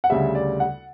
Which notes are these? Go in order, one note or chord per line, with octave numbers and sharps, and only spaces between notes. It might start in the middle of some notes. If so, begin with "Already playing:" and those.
F#5
D2 C#3 G3 E5
D5
F#5